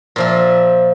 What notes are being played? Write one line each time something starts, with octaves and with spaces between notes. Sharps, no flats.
A#2 F3 E5